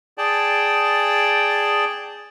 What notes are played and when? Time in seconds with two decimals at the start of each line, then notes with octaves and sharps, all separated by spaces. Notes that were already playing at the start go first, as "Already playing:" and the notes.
0.18 G#4 D5 G5 A5